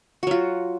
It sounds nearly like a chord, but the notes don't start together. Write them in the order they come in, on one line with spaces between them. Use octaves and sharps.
F#4 F#3 F4